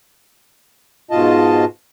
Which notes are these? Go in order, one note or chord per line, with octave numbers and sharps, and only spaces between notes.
G#2 B2 F4 D#5 A5